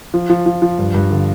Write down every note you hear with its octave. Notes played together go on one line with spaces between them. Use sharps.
F3
F3
F3
F3
G2
G2
D3